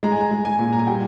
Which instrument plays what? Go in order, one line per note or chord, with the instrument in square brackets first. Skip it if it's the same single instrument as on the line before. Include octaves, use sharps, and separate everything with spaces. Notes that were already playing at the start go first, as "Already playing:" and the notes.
[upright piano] G#3 A#5
G#5
A#5
G#3
G#5
A#2
A#5
G#5
G3 G5